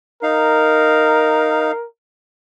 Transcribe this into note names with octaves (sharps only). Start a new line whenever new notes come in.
D#4 A#4 F5